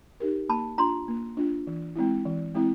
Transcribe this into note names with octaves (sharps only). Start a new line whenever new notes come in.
D#4 G4 A#4
A#3 A5 B5
D4 F4 A#5 C6
A#3
D4 F4
E3
G#3 C4 E4
E3
G#3 C4 E4